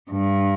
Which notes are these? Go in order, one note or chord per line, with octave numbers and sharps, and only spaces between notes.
G2